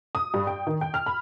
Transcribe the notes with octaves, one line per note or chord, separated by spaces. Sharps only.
D#6
G2
G5
D#3
G5
F6
B5